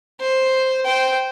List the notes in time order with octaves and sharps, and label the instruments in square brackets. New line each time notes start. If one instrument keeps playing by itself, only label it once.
[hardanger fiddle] C5
C5 G5